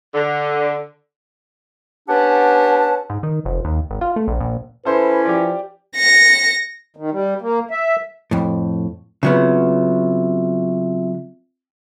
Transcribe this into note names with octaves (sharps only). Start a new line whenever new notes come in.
D3
B3 C#4 D4 G4 F#5 A5
G#2
D#3
F1
D#2
G#1
F4
A3
A#1
A#1
E3 C#4 E4 A4 B4 C5
F3 G4 D5
A#6 C#7
D#3
G3
A#3
E5
F2 A2
C#3 F#3 B3 C4 F4 E5